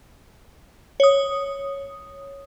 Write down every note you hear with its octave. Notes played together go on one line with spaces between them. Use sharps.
C#5 D#6